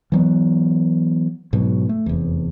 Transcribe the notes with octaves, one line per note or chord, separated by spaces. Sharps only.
E3 F#3 B3
G#2 B2 F#3
A3
F1 E2